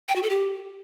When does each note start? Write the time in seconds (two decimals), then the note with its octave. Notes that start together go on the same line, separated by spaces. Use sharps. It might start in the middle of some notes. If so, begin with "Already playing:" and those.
0.09 G5
0.16 F#4
0.23 A4
0.30 G4